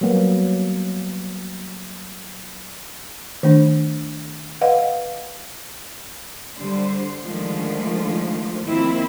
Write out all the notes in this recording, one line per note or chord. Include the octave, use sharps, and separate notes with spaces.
F#3 G3 A#3 B3
D#3 A3 D4
B4 D#5 F5 F#5
D3 G3 C5
D3 D#3 F3 G#3 A3
D#3 F3 A#3 C4 E4